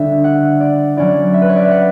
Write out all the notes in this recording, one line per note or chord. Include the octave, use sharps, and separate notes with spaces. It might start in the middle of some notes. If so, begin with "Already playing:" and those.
Already playing: D3 G3 D4 E5
F#5
D5
F#3 C#4 E4 D5
E5
B4
C#5
D5
E5
F#5